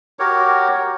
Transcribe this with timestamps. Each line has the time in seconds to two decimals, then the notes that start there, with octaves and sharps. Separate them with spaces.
0.19 F#4 G4 A#4 C#5